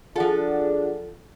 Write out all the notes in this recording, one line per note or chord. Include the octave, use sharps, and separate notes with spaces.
F3 D4 F4 G#4 A4 F#5